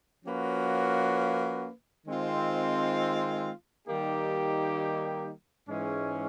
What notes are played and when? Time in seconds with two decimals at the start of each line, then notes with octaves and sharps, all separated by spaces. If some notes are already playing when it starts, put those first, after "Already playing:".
0.25 F3 A#3 C#4 F#4 B4
2.06 D#3 G#3 C4 F4
3.88 D#3 G3 A#3 D#4 G4
5.68 G#2 E3 G#3 C#4